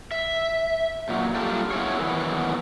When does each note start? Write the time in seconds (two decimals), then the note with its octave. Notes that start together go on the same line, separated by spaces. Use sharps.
0.11 E5
1.09 A#2 F#3
1.35 G3 A#3 D4 F4 G4 A4
1.71 B3 E4 G#4 C#5
1.99 D#3 E3 F#3 B3 E4